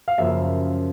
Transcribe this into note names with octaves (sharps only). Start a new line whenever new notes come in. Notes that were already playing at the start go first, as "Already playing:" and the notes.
F5
F#2 C#3 F3 A#3 E5